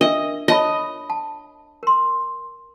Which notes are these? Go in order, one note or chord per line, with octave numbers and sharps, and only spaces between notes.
D4 A#4 D#5 E5
C#5 D#5 A5 B5
A5
A#4 C6